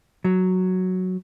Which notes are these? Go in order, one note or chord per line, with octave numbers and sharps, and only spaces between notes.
F#3